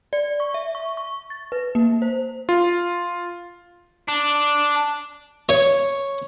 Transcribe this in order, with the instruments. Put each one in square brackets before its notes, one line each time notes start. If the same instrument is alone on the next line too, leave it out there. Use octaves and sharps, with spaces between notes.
[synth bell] D5
C#6
E5
C#6
C#6
A6
B4
A#3
C5
[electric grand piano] F4
[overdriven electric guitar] D4
[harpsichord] C#5